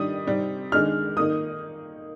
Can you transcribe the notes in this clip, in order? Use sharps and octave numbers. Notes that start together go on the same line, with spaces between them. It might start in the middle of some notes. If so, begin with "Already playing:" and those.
Already playing: D#3 G3 D4 D#6
C3 G3 C4 D#4
D#3 G#3 D4 F6
D#3 A#3 D#4 D#6